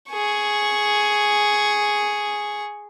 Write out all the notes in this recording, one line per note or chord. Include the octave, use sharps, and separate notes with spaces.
G#4 C#6